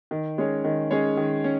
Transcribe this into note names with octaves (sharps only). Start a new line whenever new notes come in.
D#3
G#3 C#4 G#4 C#5
D#3
G#3 C#4 G#4 C#5
D#3
C#4